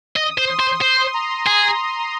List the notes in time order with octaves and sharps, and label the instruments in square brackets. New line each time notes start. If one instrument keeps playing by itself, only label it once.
[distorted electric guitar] D#5 [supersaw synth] D#6
[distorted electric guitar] C5
[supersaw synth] C6
[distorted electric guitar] C5
[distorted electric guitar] C5 [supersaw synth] C6
[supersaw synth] A#5
[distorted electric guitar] G#4